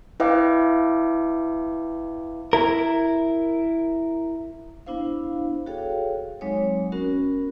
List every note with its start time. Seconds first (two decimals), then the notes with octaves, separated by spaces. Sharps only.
0.20 E4 B4 D#5 F5 G5 D6
2.53 E4 A#4
4.86 B3 D4 E4 C5 F5
5.66 F#4 G#4 A4 C#5 F5 G5
6.41 F#3 G#3 C4 D#4 C#5
6.92 B3 C#4 F#4 A#4